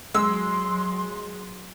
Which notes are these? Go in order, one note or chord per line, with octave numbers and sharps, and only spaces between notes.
F#3 G#3 C6 E6